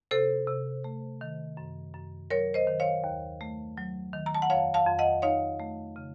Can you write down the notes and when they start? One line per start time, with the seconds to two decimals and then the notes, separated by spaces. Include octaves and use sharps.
0.11 C3 A4 C5
0.48 C3
0.84 A3
1.21 D#3
1.57 F#2
1.94 F#2
2.30 F#3 A#4 C#5
2.54 C5 D#5
2.67 D#3
2.80 C#5 F5
3.04 D#2
3.41 A3
3.77 F#3
4.13 D#3
4.26 A#5
4.35 A5
4.42 F#5
4.50 F2 C#5 F5
4.74 F5 A5
4.86 F2
4.99 D#5 F#5
5.22 D#4 C#5 F5
5.60 A3
5.96 C#3